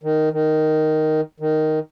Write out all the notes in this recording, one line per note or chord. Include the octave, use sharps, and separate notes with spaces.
D#3
D#3
D#3